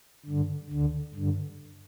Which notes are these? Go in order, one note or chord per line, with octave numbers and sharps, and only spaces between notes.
G2 D3
D2 D3
G2 D3